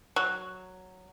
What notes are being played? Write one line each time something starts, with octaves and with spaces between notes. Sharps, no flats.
F#3